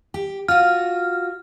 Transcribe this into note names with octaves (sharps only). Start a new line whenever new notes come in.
G4
F4 F#4 F6